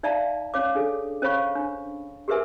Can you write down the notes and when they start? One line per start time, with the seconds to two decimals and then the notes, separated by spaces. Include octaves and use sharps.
0.03 D#4 D5 E5 F5 A5 A#5
0.54 C#4 C#5 F5 D6
0.75 D4 G#4 A4
1.22 C#4 C5 C#5 F5 B5 C#6
1.55 D4
2.28 G4 G#4 A#4 B4 E5 G#5